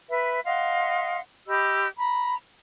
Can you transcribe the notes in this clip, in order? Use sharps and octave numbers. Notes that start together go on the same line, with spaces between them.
B4 E5
D#5 F5 F#5 C6
G4 D#5 B5 E6
A#5 B5